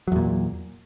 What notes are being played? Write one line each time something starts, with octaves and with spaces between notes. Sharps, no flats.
E2 A#2 F#3